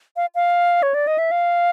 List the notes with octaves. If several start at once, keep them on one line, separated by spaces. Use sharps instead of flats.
F5
F5
C#5
D5
D#5
E5
F5